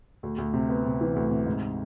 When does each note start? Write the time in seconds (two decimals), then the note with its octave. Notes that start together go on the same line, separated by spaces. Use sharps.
0.23 D2
0.38 D2
0.54 C3
0.69 B3
0.85 C3
1.01 E3
1.16 D2
1.30 C3
1.46 G#2